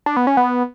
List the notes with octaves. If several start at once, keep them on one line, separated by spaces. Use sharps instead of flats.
D4
B3
C#4
B3